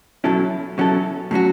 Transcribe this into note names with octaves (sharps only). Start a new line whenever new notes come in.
B2 F#3 C#4 E4 A4
B2 F#3 C#4 E4 A4
A2 F#3 C#4 F#4